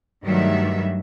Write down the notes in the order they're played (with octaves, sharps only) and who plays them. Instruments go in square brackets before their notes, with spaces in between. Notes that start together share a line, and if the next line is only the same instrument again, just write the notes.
[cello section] G2 D#3 F#3 G3 A3 E5